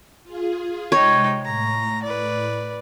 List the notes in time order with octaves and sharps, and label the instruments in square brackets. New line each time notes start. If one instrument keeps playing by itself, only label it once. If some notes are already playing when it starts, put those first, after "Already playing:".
[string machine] F4 G#4
[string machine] C3 G#3 [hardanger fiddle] D#4 G5 [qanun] C#5
[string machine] A2 [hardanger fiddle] A#5
[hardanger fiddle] B4 D5